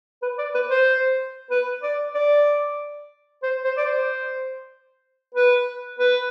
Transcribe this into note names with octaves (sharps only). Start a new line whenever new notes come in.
B4
D5
B4
C5
B4
D5
D5
C5
C5
D5
C5
B4
B4